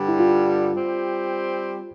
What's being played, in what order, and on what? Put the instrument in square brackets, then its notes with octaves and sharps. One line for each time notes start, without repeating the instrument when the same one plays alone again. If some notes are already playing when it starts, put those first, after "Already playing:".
Already playing: [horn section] G2 D3 G3
[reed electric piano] E4
F4
[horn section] G3 C4 G4